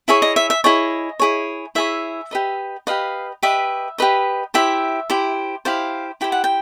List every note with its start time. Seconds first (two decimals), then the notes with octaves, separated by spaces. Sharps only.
0.08 E4 G#4 C#5 E5
0.22 D#5
0.36 E5
0.50 E5
0.64 E4 G#4 C#5 D#5
1.20 E4 G#4 C#5
1.75 E4 G#4 C#5 E5
2.31 G4 B4 D#5
2.87 G4 B4 D#5 F5
3.43 G4 B4 D#5 E5
3.98 G4 B4 D#5
4.54 E4 G4 C5 E5
5.10 E4 G4 C5
5.65 E4 G4 C5 F5
6.21 E4 G4 C5 G5
6.32 F#5
6.44 G5